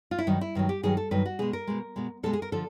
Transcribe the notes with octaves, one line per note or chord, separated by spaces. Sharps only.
F4
E4
G2 D#3 F#3 D#4
E4
G2 D#3 F#3
G4
G2 D#3 F#3 G#4
A4
G2 D#3 F#3 B4
F#4
B2 G#3 G#4
A#4
B2 G#3
B2 G#3
B2 G#3 A4
G#4
A#4
D3 F3 A4